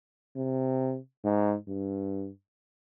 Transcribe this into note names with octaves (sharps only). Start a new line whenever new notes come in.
C3
G#2
G2